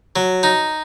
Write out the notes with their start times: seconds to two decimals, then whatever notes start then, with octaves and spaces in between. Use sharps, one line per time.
0.16 F#3
0.43 D#4